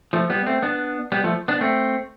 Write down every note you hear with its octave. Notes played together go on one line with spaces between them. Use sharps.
F3 A3
G3 B3
A3 C4
B3 D4
G3 B3
F3 A3
B3 D4
A3 C4